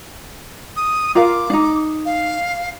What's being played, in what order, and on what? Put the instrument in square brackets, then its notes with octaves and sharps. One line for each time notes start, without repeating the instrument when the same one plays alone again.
[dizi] D#6
[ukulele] F4 A#4 F5 [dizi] D6
[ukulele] D4 D#4
[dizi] F5